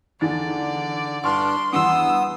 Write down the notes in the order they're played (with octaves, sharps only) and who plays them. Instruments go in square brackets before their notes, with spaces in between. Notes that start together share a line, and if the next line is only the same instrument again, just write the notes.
[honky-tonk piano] E2 D#3 A6 [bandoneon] D3 [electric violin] D5
[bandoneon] G2 D4 [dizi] C6 [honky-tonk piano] C#6 F6
[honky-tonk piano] E2 G2 [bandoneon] B3 D#6 [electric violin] E6